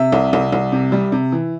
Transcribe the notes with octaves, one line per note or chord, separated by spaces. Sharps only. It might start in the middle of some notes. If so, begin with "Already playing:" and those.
Already playing: C3 E5
C2
C2
C2
C3
G3
C3
E3